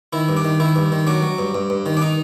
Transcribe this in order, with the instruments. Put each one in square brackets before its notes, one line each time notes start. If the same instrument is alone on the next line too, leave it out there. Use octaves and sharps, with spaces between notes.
[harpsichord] D#3 E4
G2
D4
D#3
D#3 E4
G2
D#3
F#3 D4
F#3
G2
G2
G2
D#3
D4
D#4